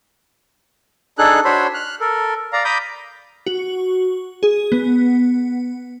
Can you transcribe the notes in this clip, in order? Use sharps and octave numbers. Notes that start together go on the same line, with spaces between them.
D4 D#4 G#4 A4 F#6
D4 F#4 C5 C#5 B5 C6
F6 F#6
A4 A#4
D5 F5 A#5
A#5 B5 D6 D#6 G6
F#4
G#4
B3